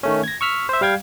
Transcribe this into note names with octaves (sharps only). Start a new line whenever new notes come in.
D#3 A3 C#4
G#6 A#6
C#6 E6 F6 B6
C5 E5
G3 F5 G5 G#6